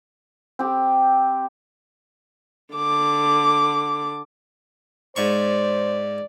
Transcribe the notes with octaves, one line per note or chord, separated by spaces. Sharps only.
C4 G4
D3 D6
G#2 C5 D5 C#6